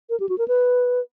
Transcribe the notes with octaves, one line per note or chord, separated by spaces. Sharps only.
A#4
G4
F#4
A#4
B4